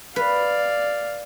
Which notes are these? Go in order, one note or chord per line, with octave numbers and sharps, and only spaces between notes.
B4 D5 F5